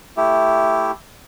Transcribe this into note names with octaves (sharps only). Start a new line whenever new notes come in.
A3 E4 G4